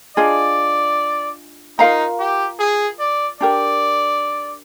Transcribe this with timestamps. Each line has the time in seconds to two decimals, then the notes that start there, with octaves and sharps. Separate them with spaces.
0.17 D4 F4 G#4 D5 D#5
1.79 D#4 F4 A#4 F5 A#5
2.19 G4
2.60 G#4
2.99 D5
3.41 D4 G4 A#4 D5